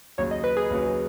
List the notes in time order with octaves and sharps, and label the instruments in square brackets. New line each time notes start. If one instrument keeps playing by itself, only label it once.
[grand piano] D#2 C#3 F#3 [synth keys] C#5
[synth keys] D#5
B4
G#4
[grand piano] D#2 C#3 F#3